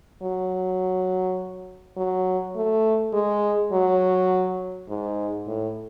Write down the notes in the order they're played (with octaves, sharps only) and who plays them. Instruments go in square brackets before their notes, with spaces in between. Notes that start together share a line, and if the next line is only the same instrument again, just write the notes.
[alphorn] F#3
F#3
A3
G#3
F#3
G#2
A2